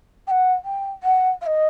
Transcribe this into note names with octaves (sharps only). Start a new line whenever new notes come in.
G5
F#5
G5
F#5
F5
D#5